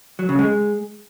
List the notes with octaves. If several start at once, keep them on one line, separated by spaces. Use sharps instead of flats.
F#3
C#3
G#3